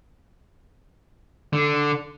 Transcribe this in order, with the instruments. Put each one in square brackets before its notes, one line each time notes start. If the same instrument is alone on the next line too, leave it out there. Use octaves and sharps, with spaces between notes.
[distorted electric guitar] D3